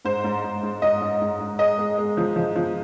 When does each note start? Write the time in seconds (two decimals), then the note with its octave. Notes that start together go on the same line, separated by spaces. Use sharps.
0.05 G#2 C5
0.24 G#2
0.43 G#2
0.63 G#2
0.82 G#2 D#5
1.01 G#2
1.21 G#2
1.40 G#2
1.59 G#3 D#5
1.78 G#3
1.98 G#3
2.17 F3
2.36 F3
2.56 F3